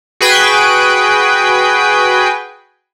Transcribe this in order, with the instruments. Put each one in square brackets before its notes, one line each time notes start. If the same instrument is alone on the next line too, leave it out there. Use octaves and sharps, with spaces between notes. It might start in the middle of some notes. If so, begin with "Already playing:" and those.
[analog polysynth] F#4 G#4 B4 G5 G#5